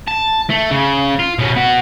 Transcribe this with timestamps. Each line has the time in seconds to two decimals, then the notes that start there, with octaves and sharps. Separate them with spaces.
0.08 A5
0.50 A3
0.71 C#3
1.19 F4
1.39 B2 C#4
1.56 B3 F#4